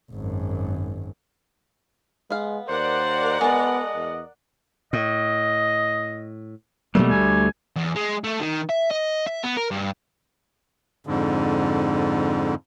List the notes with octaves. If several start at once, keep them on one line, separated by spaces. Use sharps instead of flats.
G#1 F#2
G#3 B3 F5
D#2 A#4 C5 D5 F#5
G#3 B3 D#5 A5
E2
A2 D#5
B2 F#3 G3 A3 A#3
D2 G#5
E2
G#3
A3
D#3
E5
D#5
E5
B3
A#4
G2
F2 G#2 D3